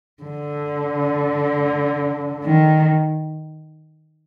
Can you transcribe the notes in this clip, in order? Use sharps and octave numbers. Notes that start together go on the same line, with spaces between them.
D3
D#3